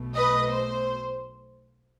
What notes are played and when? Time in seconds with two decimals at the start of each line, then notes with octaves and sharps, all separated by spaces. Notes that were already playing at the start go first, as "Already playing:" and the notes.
Already playing: B1 B2 A3
0.15 B4 D#5
0.49 C5